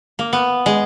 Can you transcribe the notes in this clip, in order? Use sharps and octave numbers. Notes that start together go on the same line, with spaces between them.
A#3
B3
G#3